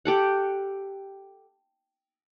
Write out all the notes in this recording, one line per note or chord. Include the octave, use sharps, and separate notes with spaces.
G4 A4 F#5